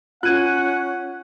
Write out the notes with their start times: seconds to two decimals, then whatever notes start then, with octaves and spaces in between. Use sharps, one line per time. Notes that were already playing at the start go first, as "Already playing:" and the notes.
0.23 C#4 F4 F#5 F#6 G#6 D#7